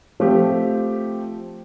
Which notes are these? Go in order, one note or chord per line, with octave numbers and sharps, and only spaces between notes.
F3 A3 C4 G4